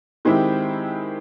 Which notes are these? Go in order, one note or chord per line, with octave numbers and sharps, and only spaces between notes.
D#3 G#3 C4 E4 G4